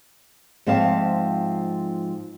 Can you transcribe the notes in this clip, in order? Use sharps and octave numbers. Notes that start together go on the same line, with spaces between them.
G#2 F3 C4 E5 F5 A5